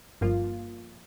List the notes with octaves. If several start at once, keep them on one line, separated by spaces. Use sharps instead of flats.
G1 G2 F3 A#3 F4